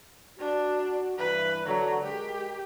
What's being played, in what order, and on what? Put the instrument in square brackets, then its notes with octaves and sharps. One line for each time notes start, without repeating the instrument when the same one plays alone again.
[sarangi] D4 [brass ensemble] F#4
[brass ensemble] G2 E3 [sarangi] B4
[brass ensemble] D3 [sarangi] F#3
[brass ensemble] G#3 A#4 [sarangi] G4